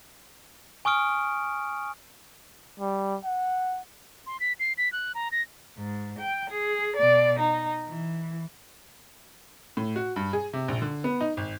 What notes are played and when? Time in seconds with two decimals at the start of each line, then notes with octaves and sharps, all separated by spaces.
0.85 G#5 C#6 D#6 F6 D7
2.79 G3
3.24 F#5
4.27 C6
4.40 B6
4.60 C7
4.78 B6
4.92 F#6
5.15 A#5
5.32 A#6
5.77 G#2
6.19 G5
6.50 G#4
6.96 B2 D5
7.39 D#4
7.88 E3
9.77 A2
9.96 F#4
10.16 G2
10.33 G#4
10.53 C3
10.68 A#1
10.82 D3
11.04 B3
11.21 D#4
11.37 G#1